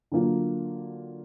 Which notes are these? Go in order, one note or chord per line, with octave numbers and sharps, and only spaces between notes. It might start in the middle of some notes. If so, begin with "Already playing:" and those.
D3 F#3 A#3 D4 F4